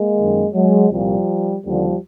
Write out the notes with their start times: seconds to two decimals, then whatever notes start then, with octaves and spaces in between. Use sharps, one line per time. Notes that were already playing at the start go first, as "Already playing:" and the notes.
Already playing: G#3 A#3
0.17 F#2 D#3
0.53 F#3 G#3
0.89 C2 F3 G3
0.95 A#2
1.62 D#2 D3 F3 G3